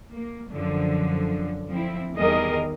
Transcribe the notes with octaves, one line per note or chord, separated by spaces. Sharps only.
A#3
F#2 D3 F3
F3 C4 E4
E2 D#3 G3 G#4 A#4 D#5